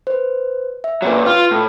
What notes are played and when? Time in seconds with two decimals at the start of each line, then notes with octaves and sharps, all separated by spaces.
0.07 B4 C5
0.84 E5
1.02 A#2 F#3 B4 C#5
1.26 F4 F6
1.51 A2